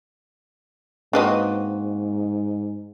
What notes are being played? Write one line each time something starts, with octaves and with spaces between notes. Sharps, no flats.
G#2 A#3 C4 D4 F#4 B4 D#5